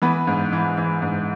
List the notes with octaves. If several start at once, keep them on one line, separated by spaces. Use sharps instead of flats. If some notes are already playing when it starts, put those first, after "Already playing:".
E3 B3 B4
G#2
E3
E3
G#2